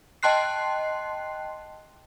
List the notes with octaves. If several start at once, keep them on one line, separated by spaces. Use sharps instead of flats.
D#5 G5 A5 C6 F#6 C7